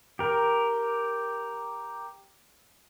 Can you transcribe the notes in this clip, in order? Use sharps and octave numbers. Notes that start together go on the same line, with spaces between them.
G4 A#4